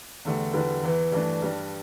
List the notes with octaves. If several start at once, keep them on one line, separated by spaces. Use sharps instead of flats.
E2 D3 A3 G4
E2 D3 G3 B3 E4
E2 E3 B3 E4
G2 E3 A3 D4
G2 G3 D4